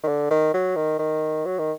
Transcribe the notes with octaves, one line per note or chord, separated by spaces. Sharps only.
D#3
D3
D#3
F#3
D#3
D#3
F#3
D#3